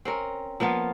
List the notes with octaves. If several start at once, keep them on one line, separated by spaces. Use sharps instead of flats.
C4 C#4 A#4
F3 A#3 B3 F4